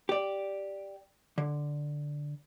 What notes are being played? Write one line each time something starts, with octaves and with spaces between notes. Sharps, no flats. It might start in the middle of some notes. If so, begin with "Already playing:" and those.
G4 D5
D3